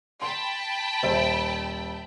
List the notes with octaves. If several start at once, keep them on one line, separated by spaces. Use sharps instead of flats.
G5 A5 B5 C6
D#1 C5 E5